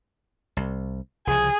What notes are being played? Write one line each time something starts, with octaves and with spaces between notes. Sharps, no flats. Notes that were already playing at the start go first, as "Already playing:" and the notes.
C2
C2 C#3 F3 G#4